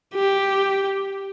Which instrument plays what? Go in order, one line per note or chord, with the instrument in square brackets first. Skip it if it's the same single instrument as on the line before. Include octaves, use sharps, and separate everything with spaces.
[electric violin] G4